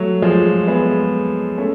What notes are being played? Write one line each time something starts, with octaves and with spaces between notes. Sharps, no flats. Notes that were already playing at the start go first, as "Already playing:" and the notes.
Already playing: F#3 A3
F3 G#3
G#3 B3
A3 C#4